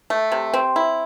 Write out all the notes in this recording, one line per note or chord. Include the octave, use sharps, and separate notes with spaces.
A3
C3
C4
E4